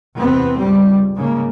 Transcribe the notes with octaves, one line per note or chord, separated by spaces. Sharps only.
E2 C3 B3 C4
C#2 G2 G3
G#2 C#3 A#3